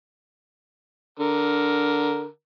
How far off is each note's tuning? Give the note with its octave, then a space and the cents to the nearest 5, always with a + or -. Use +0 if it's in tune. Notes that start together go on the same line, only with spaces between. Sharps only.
D3 -10 A#4 +5